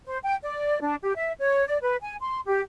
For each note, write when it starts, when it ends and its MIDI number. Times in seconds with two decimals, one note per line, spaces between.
0.06 0.17 72
0.23 0.35 79
0.43 0.78 74
0.82 0.95 62
1.03 1.13 67
1.15 1.31 76
1.39 1.64 73
1.67 1.78 74
1.82 1.96 71
2.01 2.15 80
2.21 2.40 84
2.46 2.61 67